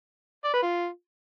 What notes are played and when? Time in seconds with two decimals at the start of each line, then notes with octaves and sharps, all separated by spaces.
0.44 D5
0.53 B4
0.63 F4